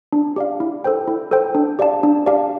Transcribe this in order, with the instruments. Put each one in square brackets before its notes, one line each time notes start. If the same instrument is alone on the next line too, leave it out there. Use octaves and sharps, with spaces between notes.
[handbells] D4
G4 D5 F5
E4
A4 C5 G5
E4
A4 C5 G5
D4
G4 D5 F5 A5
D4
G4 D5 F5 A5